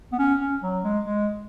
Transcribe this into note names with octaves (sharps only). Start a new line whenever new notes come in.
B3
C#4
C#4
F#3
G#3
G#3